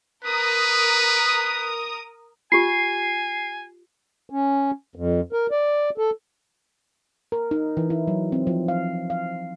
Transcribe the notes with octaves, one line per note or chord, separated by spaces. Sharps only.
A#4 B4 D#6
F4 G4 G#5 C7
C#4
F2
A#4
D5
A4
A#4
D#4
E3
E4
F#3
C4
F3
F5
F5